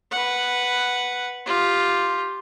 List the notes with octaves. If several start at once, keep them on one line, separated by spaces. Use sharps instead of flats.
B4 F#5
F4 G4